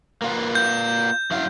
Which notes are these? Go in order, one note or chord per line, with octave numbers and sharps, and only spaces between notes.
A#3 F4 B4
G6
F#2 E4 F5